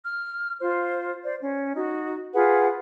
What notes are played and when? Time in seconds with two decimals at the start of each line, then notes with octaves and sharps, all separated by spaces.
0.03 F6
0.60 F4 C5
1.23 C5 D5
1.40 C#4
1.74 D#4 F#4
2.33 F4 G#4 B4 F#5